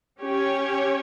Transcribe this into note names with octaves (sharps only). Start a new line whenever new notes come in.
C#4 G4 C#5